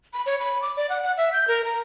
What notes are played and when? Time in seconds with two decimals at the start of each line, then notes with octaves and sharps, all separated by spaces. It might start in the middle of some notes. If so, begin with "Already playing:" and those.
0.13 B5
0.26 C#5
0.40 B5
0.62 D6
0.77 D5
0.90 F#5
1.03 F#5
1.17 E5
1.33 G6
1.48 A#4
1.64 A#5